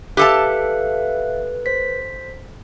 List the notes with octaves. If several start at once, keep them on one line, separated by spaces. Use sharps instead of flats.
G4 A4 B4 E5 F5 A5 F#6
C5 B6